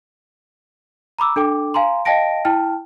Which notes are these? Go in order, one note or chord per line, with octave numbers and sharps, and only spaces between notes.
A#5 B5 D6 E6
D4 A4 G5 D6
F5 G#5 A#5 C6
D#5 F5 G5 A5 A#6 D7
E4 G5 A5 F6